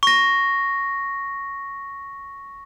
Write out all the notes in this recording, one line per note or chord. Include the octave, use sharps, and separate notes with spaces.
C#6 A#6